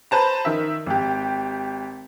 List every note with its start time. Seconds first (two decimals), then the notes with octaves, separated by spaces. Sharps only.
0.11 B4 C5 A5 A#5
0.45 D#3 E5
0.86 G#1 G4